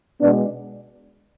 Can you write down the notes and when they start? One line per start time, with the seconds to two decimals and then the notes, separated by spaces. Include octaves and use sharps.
0.21 B2 G#3 B3 D4